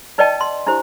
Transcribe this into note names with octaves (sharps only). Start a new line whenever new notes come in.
D#4 B4 D5 D#5 G5 A5
C6
D4 E4 G4 C5